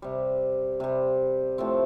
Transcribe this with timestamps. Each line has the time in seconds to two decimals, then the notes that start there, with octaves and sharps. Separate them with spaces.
0.02 C3 G3
0.80 C3 G3
1.58 A2 F3 A3 C4